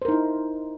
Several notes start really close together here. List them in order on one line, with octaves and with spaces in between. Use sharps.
C5 A#4 D#4 E4